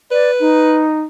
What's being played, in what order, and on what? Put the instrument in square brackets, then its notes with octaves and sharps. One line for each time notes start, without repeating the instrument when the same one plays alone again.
[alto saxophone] B4 [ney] D5
[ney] D#4